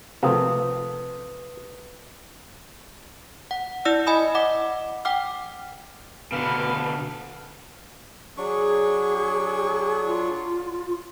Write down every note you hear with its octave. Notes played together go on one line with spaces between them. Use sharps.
C3 F3 A3 A#3 C4 B4 D#6
F#5
E4 D5 E6
D#5 G#5 B5 D#6
D#5 F#5 D6
F#5 G5 D6 F6
B2 D3 B4 F5
F#3 D4 G#4 C#6
F4